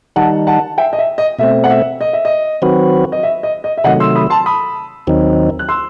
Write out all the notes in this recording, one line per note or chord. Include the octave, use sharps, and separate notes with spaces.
D#3 G3 D#4 F#5 A5
F#5 A5
E5 G5
D#5
E5
D#5
B2 A3 C4 E5
F#5
E5
D#5
E5
D#5
D#3 F#3 C4 F#4 B4
D#5
E5
D#5
D#5
E5
C3 D#3 F#3 A3 D#5 F#5
C6 E6
B5 D#6
A5 C6
B5 D#6
D#2 D#3 F#3 C4 D#4
F#6
C6 E6